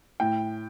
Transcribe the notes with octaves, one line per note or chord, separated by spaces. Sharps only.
A2 G5